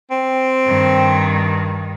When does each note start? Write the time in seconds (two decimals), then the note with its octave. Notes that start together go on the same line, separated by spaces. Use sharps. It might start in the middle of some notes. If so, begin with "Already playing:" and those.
0.11 C4
0.66 G2 D#3